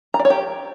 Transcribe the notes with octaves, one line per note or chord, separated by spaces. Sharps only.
A#5
D5
C#5
G4